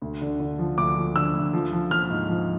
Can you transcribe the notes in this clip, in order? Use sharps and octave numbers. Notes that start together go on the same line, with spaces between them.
D2
D3
D3
F3
D2 D6
F3
D3 E6
D2
F3
F3
F3 F6
G#2
F3